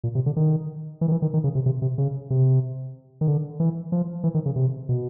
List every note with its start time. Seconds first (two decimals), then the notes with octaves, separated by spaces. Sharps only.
0.04 A#2
0.15 C3
0.26 D3
0.36 D#3
1.01 E3
1.08 D#3
1.12 E3
1.22 D#3
1.34 D#3
1.44 C#3
1.55 C3
1.66 C3
1.82 C3
1.98 C#3
2.30 C3
3.21 D#3
3.27 D3
3.60 E3
3.92 F3
4.24 E3
4.34 D#3
4.46 C#3
4.56 C3
4.89 B2